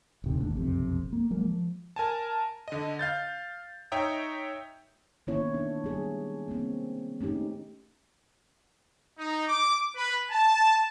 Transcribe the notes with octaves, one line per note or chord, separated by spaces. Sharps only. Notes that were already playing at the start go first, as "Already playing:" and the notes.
D#1 C3 D#3
G#1 D#2 A2 D4
F#1 B1 F2 C3
A#3
F#3 G#3 A#3
F3
A#4 G#5 A5
D3 D#5
F5 G6 A6
D#4 C#5 E5 G5 A#5 D#6
D#3 A#3 B3 C#4 E4 C#5
D4
G3 G#4
A#3 C4
A3 C#4 D#4 G4
D#4
D6
B4
A5